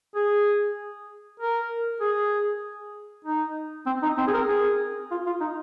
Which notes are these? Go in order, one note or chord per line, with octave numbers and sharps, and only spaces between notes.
G#4
A#4
G#4
D#4
C4
D#4
C4
G#4
A#4
G#4
F4
F4
D#4